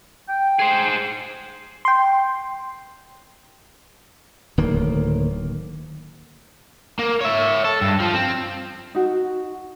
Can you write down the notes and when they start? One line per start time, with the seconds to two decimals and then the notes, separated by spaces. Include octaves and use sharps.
0.29 G5
0.59 G#4 C5
1.85 G5 C6
4.58 D1 D#3 A#3
6.99 A#3
7.21 C#5 E5
7.65 A4
7.81 G2
8.00 F3
8.14 C4
8.95 D#4 F#4